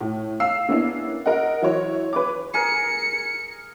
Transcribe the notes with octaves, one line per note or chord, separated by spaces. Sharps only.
A2
F5 E6 C7
A#3 B3 C#4 D4 E4 C7
A#4 D#5 F#5
E3 F#3 E4 C5 C#5
B4 C#5 D6
G#4 A#4 C#7